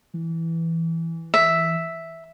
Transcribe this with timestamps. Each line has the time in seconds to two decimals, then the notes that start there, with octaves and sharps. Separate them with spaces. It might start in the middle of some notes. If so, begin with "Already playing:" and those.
0.14 E3
1.34 E5